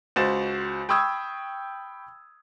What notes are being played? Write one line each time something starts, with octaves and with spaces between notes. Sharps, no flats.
C#2 F#4 C5 A6 E7
G5 B5 C#6 D#6 E6 G#6